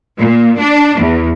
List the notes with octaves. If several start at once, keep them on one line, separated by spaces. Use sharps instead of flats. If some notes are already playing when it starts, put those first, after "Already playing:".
A#2
D4
E2